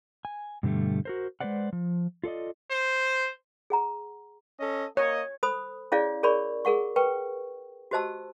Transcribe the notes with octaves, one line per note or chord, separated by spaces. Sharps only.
G#5
G2 B2 D3 G3 A3
F#4 A#4 C5
G#3 A3 B4 C5 D5 F#5
F3
F4 A4 D5 D#5
C5
G#4 F#5 A#5
C#4 A4 D#5
A#3 C#5 D#5
A4 C5 B5 D#6
C#4 E4 G#4 C#5 D5 F5
G#4 A#4 C#5 D5 B5 C#6
G#4 A#4 F#5 C#6
A#4 B4 G5 C#6
F#4 G4 C5 D#5 A5 E6